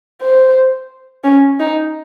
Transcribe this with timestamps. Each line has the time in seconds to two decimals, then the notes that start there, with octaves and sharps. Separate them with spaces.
0.22 C5
1.24 C#4
1.60 D#4